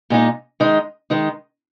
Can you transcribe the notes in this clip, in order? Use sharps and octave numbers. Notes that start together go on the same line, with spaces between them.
A#2 G#3 D#4
D#3 G#3 D#4
D#3 G#3 D#4